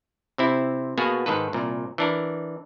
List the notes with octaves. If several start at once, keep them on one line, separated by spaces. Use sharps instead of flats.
C3 C4 E4
B2 A#3 B3 F#4 G#4
G#2 D#3 A4 B4
C2 A#2
E3 D4 A#4